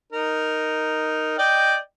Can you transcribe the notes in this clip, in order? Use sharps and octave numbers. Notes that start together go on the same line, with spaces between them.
D#4 A#4
D5 D#5 G5